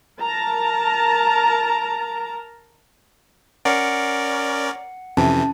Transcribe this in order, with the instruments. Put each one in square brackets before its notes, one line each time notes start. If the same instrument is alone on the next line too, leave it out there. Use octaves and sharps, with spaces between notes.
[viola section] A#4 A5 A#5
[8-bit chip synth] C#4 A#4 D5 [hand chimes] F#5 C#7
[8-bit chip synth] F2 C3 E3 [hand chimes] C#4 A5